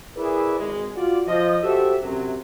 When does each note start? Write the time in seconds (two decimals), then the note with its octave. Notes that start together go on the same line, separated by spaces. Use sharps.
0.16 E4 G#4 A#4 B4 D5 E5
0.58 G#1 G#3
0.96 F4 F#4 D5
1.26 F3 D#5
1.62 F#4 G4 A4 C5 E5
2.01 F#2 C3 F#3